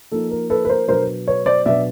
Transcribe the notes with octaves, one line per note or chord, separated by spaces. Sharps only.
F3 A#3 D#4 A4
A#4
A4 B4
B4
A#4 C5
B2 F#3 B3 D4 A#4 C5
B4 C#5
C5 D5
B2 F#3 B3 D4 D5 E5